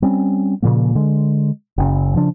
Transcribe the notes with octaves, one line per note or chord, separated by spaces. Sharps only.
G3 C4 C#4
A#2 C#3 F3 A#3
D3 G#3
F#1 C#3
C#3 F3 D4